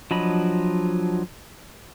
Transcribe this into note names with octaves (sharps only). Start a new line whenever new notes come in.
F3 F#3 D4 D#5 B5